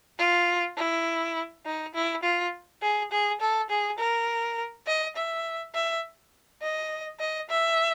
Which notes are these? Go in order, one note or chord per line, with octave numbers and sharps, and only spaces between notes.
F4
E4
D#4
E4
F4
G#4
G#4
A4
G#4
A#4
D#5
E5
E5
D#5
D#5
E5